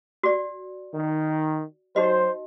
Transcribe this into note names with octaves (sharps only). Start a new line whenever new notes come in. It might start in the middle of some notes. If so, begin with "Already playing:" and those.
F#4 D5
D#3
F#3 D#4 F#4 C5 D#5